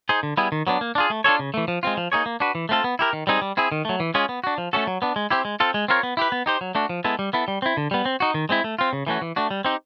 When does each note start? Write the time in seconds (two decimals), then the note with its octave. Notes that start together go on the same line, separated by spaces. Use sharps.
0.09 D#4 G#4 C5
0.23 D3
0.37 G3 B3 E4 G#4
0.52 D#3
0.67 F#3 B3 D4
0.81 A#3
0.95 D4 F4 G#4
1.10 A3
1.24 D4 F4 A4 C#5
1.39 C#3
1.54 E3 A3
1.68 F3
1.83 G#3 C4 F4
1.97 F3
2.12 A#3 D#4 G#4 C#5
2.26 A#3
2.40 D4 F#4 B4
2.55 E3
2.69 A3 C4 F4 A4
2.84 B3
2.99 E4 G4 A#4
3.13 D#3
3.27 G3 C4 D#4 G#4
3.42 G3
3.57 C4 E4 G#4
3.72 D#3
3.85 F#3 A3
4.00 E3
4.14 G#3 C#4 F4 G#4
4.29 B3
4.44 D4 F#4
4.58 F3
4.73 A3 C#4 F#4 A4
4.87 F#3
5.02 B3 D4
5.16 G#3
5.30 C4 E4 G4
5.45 G#3
5.60 C4 F4 A4
5.74 G#3
5.88 C4 F4 A#4 C#5
6.03 B3
6.17 E4 G4 B4
6.32 B3
6.46 D#4 G4 C5
6.61 F#3
6.75 A3 D4 F#4
6.89 F3
7.04 G#3 B3 E4 A4
7.19 G3
7.33 B3 E4 A4
7.48 G3
7.62 C4 E4
7.77 D3
7.91 G3 B3
8.05 C4
8.20 D#4 F#4
8.34 D#3
8.49 G#3 C4 E4
8.64 A3
8.79 C4 F4
8.93 C#3
9.07 E3 A3 C#4 F#4
9.22 E3
9.36 A3 D4 F#4
9.51 G3
9.65 C4 D#4 G4